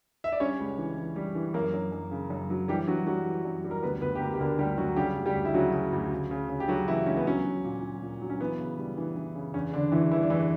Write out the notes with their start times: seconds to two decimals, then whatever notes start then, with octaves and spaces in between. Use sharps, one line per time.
0.24 E5
0.32 D5
0.40 G3 C#4 C#5
0.59 C#2
0.78 E3
0.97 E3
1.16 G3
1.35 E3
1.54 F#2 A#3 A#4
1.74 F#2
1.92 F#2
2.11 C#3
2.30 F#2
2.50 F#3
2.68 E3 G3 G4
2.87 E3 F#3 F#4
3.06 F#3 G3 F#4
3.26 E3
3.45 F#2
3.64 G3
3.71 A#4
3.82 D2 B3 B4
4.01 D2 B3 B4
4.15 G4
4.20 D2 A#3 A#4
4.34 G4
4.40 D3 A#3 A#4
4.59 D2 G3 G4
4.77 D2 F#3 F#4
4.96 C#3 G3 G4
5.16 D2
5.26 G3 G4
5.35 D2
5.45 E4
5.54 C#3 F#3 F#4
5.73 C#3
5.93 D2
6.12 C#3
6.31 C#3
6.49 C#3
6.60 G4
6.68 C#3 F#3 F#4
6.87 C#3 E3 E4
7.06 C#2 C#4
7.17 B3
7.25 F#3 C#4
7.44 F#3
7.64 A#2
7.82 F#3
8.02 A#2
8.21 F#3
8.30 C#4
8.40 E3 B3
8.59 C#3
8.78 G3
8.97 E3
9.16 E3
9.35 C#3
9.54 E2 C#4
9.73 E2 D3 D4
9.92 E2 E3 E4
10.11 E3 G3 E4
10.22 D4
10.30 E2 E3 E4